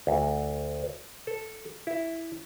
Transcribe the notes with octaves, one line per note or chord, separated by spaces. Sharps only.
D2
A4
E4